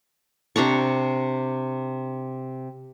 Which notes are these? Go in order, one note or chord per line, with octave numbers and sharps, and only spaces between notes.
C3 D4 A#5 C#6